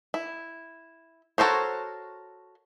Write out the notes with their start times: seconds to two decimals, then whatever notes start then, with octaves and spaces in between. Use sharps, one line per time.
0.14 E4
1.38 F#4 A4 A#4 C5 C#5